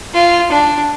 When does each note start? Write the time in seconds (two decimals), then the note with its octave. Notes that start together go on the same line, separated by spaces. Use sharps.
0.14 F4
0.52 D4